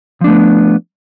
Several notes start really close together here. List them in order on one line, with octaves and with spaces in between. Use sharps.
F3 D4 A3 B3